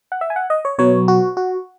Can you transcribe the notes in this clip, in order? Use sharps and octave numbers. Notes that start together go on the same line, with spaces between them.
F#5
E5
G#5
F#5
D#5
C#5
B2 F#3 B3 C#5
F#4
F#4